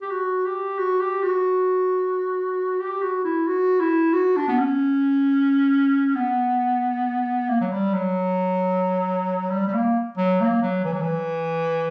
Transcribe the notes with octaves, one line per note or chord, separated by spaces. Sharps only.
G4
F#4
G4
F#4
G4
F#4
G4
F#4
E4
F#4
E4
F#4
D4
B3
C#4
B3
A#3
F#3
G3
F#3
G3
G3
A#3
F#3
A#3
F#3
E3
F#3
E3